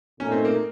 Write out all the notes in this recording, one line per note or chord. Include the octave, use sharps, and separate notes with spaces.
A#2 A3 C#4 D#4
C4
A#3